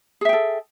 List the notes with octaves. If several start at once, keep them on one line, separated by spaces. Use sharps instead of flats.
G#4 A4 E5 G5